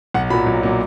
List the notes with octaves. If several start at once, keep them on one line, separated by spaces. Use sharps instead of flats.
B1 F#5
A#2 F#3 B5
B1
A#2 F#3